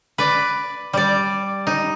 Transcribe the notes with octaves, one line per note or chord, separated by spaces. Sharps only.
B4 D5
G3 D5
D#4